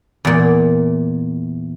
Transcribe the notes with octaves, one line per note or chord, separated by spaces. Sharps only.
E2 A#2